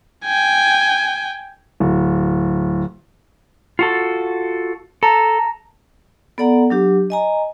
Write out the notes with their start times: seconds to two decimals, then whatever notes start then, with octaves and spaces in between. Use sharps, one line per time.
0.25 G5 G#5
1.80 D1
3.79 F4 F#4 A4
5.03 A4 A5 A#5
6.38 B3 A4 D5 F#5 A#5
6.70 F#3 D4 G4
7.10 D#5 G#5 A#5